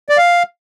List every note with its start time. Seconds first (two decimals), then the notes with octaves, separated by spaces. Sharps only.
0.09 D5
0.17 F5